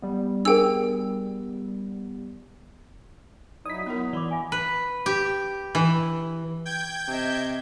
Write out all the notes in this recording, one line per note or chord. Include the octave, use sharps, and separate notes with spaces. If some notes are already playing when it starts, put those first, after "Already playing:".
G3 B3
D4 G#4 A#4 G5 E6
F#3 D#4 E4 D5 D#6 B6
F#3 B3 E4 A#4
E3 D5 B5 D6
D2 E5 G#5 B5
B4
G4
E3
G5 G6 G#6
C3 D#5 E5